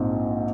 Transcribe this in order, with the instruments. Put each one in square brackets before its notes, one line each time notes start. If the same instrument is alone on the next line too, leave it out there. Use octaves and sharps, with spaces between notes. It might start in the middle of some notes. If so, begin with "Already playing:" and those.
Already playing: [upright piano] A#1 G#2 C4